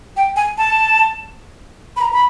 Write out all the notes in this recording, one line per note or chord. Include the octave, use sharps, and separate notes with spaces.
G5
G#5
A5
B5
A#5
B5